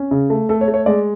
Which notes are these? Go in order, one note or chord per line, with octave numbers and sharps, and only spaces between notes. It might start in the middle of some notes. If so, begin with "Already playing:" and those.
Already playing: C#4
C#3
A3
A3 A4
C#5
A3
C#5
G#3 D5